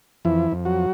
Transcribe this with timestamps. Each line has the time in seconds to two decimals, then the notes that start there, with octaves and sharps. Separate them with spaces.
0.25 F2 E3 E4
0.52 F2
0.65 F#3 F#4